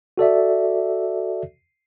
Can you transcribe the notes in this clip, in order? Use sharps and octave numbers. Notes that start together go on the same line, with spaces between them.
F#4 A4 D5 E5